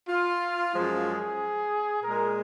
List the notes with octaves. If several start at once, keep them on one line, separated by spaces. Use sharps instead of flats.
F4
F#2 F3 G#3
G#4
A#2 G#3 A#4